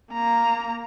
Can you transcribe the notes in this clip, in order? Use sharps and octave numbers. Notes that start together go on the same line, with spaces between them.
A#3 A#5